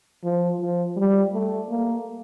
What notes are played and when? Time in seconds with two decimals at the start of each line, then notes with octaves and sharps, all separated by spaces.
0.24 F3
0.60 F3
0.97 G3
1.33 A3
1.70 A#3